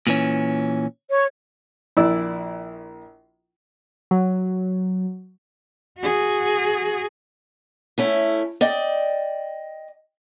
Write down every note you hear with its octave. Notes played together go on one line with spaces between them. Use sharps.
A#2 E3 C#4
C#5
A#1 E4 D5 E6
F#3
F#4 G#4
A3 C#4 E4
D5 D#5 G5